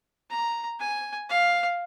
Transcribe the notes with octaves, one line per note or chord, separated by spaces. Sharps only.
A#5
G#5
F5